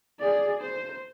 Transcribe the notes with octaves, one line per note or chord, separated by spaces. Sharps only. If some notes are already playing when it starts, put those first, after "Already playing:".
G#4 D5
C5